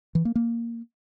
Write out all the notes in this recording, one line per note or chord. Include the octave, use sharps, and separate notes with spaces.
E3
A#3
A#3